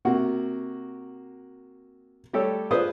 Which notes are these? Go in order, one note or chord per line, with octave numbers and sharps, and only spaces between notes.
C3 A#3 F#4
G3 A3 G4 A4 C#5
F4 G#4 B4 C5 D5 D#6